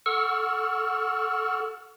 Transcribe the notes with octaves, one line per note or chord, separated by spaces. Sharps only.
A4 F#5 C#6 E6 F6